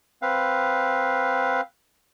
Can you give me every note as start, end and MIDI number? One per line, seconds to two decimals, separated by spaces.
0.22 1.61 60
0.22 1.61 71
0.22 1.61 77